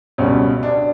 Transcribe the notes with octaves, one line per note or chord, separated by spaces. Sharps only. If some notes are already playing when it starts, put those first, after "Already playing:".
C#2 B2 G3 C#4
D4